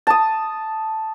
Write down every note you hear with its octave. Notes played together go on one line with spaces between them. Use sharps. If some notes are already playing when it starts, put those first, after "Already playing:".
A5 D#6